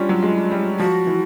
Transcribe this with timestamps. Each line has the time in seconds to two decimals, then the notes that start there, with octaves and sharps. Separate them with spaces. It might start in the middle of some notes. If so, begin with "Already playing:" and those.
Already playing: G3 C#4 D4 F4
0.09 F#3
0.23 G#3
0.51 G3
0.79 F3 F#4
1.07 E3